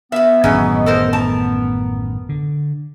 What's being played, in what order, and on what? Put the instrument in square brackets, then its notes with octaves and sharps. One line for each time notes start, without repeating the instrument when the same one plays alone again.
[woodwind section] B3 [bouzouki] F#4 F5 [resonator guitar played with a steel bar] E5
[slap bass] A1 F#2 D#3 [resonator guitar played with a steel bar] F#3 C#4 [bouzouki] G#3 B4 D#5
[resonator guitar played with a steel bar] A4 A#4 C5
[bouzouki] A#4 [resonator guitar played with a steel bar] A5
[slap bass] D3